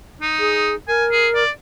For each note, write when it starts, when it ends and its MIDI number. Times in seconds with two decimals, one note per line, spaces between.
0.22 0.72 63
0.39 0.75 68
0.88 1.44 70
0.88 1.06 80
1.12 1.28 68
1.35 1.50 74